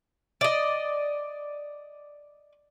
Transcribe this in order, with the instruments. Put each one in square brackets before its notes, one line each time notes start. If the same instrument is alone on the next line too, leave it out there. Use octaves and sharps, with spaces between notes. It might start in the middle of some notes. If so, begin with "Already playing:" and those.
[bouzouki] D5 D#5